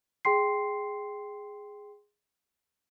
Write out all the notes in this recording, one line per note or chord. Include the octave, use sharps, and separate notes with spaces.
G#4 G5 C6 C7